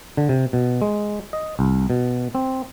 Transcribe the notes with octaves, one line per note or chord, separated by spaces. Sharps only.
D3
C3
B2
G#3
D#5
C2
B2
C4